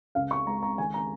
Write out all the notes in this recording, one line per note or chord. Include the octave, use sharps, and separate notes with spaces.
C#2 F5
C#6
G#3 A#5
A#5
D#3 G#5
A#5